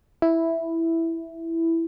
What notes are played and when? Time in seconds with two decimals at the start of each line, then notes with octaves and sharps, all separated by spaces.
0.22 E4